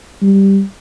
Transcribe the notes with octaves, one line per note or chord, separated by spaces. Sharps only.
G3